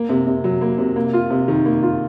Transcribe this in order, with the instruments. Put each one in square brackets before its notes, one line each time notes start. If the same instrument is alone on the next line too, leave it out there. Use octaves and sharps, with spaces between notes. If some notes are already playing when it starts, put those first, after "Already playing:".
Already playing: [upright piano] A#3
C3
C3
F#3
A#3
C3
A#3
F4
C3
D#3
A#3
F4